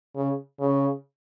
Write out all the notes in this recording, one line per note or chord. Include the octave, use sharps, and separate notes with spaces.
C#3
C#3